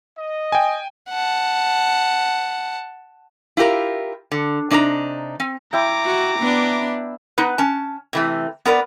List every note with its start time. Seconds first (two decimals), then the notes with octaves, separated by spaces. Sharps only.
0.18 D#5
0.52 G5 G#5
1.10 F#5 A5
3.57 E4 F4 G4 A#4
4.32 D3
4.71 C3 D4 D#4 C#5 A#5
5.40 C4
5.73 E4 G5 A#5 D6
6.05 F#4
6.39 B3 D4
7.38 B3 D#4 B4
7.58 C#4 A5
8.13 C3 E3 A3
8.65 B3 A#4 B4 D5